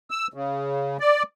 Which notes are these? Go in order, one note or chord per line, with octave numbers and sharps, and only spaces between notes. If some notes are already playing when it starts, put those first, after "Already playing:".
E6
C#3
D5